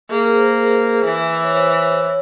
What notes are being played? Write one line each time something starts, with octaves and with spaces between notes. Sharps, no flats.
A#3 G#4
A#4
C5
A#4
A#4
E3
E5
C#5
C5
C#5